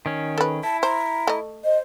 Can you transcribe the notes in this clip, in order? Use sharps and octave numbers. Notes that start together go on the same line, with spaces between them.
D#3 C#4
A4 B4
E4 A5
C5 A#5
A3 D#5
C5 D#5